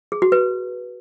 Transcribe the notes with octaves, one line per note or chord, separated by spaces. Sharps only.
G#4
F#4
B4